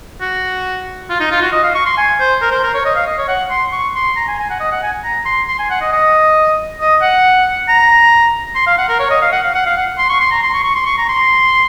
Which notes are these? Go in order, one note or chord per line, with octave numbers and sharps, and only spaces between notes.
F#4
F4
D#4
F4
F#4
D#5
F5
C#6
C6
G#5
C5
A#4
C5
A#4
C#5
D#5
F5
D#5
C#5
F#5
C6
C#6
C6
A#5
G#5
G#5
F#5
D#5
F#5
G#5
A#5
C6
C6
G#5
F#5
D#5
D#5
D#5
F#5
A#5
C6
F5
F#5
A#4
C#5
D#5
F5
F#5
F5
F#5
F5
F#5
C6
C#6
C6
A#5
C6
C#6
C#6
C6
C#6
A#5
C6